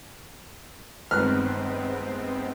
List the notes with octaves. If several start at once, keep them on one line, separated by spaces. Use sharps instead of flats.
G1 D#3 G#3 B3 C4 F6 F#6